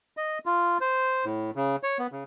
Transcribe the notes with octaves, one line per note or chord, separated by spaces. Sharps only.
D#5
F4
C5
A2
C#3
C#5
B3
C#3